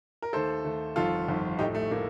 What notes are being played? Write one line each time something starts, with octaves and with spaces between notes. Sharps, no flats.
A#4
D#2 D#3 A3 A4 C5
D#2 D#3 A3
G1 F2 D#3 F4 A4
G1 F2 D#3
A#1 A2 A3 D#4 G4
A3
A2 A3 A#3